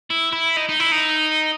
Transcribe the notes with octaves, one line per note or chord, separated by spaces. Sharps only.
E4
E4
D#4
D#4
E4
D#4